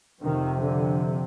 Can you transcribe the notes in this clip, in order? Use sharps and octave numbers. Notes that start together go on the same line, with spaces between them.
F2 C3 D#3
D3